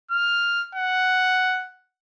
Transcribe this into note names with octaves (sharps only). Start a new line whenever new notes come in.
F6
F#5